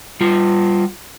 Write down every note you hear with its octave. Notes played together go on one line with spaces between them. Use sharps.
G3 F4